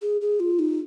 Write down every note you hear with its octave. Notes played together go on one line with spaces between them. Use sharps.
G#4
G#4
F4
D#4